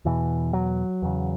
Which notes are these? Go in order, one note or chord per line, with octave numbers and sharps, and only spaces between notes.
E2 B2 E3
F#3
E2 C#3